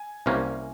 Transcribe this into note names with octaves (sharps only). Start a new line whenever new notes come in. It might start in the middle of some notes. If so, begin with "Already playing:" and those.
Already playing: G#5
C2 C3 G3 A#3 C#4